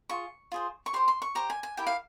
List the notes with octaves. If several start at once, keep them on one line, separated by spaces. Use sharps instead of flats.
F4 G#4 C#6
F4 G#4 C5
C#6
G4 C5 C6
C6
C#6
G4 C5 A#5
G#5
G#5
E4 G4 A#4 G5
F5